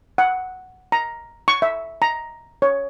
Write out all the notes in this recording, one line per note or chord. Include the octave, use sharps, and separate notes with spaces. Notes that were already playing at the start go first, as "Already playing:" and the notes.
F#5
A#5
C#6
E5
A#5
C#5